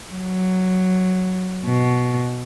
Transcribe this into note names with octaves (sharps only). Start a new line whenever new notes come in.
F#3
B2